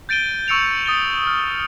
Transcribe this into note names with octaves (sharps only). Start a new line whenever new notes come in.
G6 A6 D7 D#7 G7
C#6 E6 C#7 D7 F7 G7
D#6 A6 G7
F6